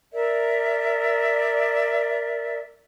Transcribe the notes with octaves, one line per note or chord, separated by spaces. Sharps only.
A#4 D5 E5